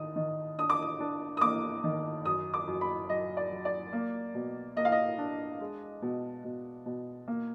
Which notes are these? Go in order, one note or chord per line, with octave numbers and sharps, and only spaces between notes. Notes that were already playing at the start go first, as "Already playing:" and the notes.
Already playing: D#3 D#6
D#3
D4 D#6
D6
D#6
D4
D#6
A#3 D6
D#3
F#2 D#6
D6
F#2
B5
F#3 D#5
D5
F#3
D5
A#3
B2
A#3 D#5
F5
D#5
D4
G#3
B2
B2
B2
A#3